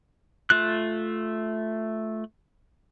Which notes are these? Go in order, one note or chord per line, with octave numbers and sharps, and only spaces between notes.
A3 F4 F#6